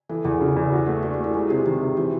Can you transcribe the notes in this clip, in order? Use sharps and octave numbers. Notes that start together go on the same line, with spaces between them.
E3 A4
E2 G#4
C#3
E2
F#4
A3
D4 F#4
G4
A3
E4
G#3 F4
C3 G4
D#3 G4
C3
E3 F#4